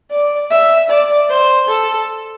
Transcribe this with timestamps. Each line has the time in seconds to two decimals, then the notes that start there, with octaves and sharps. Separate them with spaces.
0.11 D5
0.50 E5
0.90 D5
1.30 C5
1.68 A4